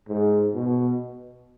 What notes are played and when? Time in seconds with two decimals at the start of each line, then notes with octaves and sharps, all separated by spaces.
0.08 G#2
0.54 B2